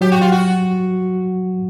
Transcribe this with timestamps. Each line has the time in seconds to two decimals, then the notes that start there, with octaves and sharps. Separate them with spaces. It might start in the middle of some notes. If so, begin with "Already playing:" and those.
0.01 F#3 G4
0.12 F#4
0.21 F4
0.32 F#4